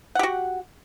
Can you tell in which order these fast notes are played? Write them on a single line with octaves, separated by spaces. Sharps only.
F#5 G4 F#4